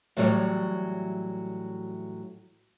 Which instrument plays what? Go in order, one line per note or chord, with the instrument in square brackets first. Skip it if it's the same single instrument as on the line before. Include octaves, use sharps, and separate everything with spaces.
[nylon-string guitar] A2 E3 F#3 G3 C#5